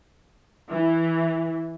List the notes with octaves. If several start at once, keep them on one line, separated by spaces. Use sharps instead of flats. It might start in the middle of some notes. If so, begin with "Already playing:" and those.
E3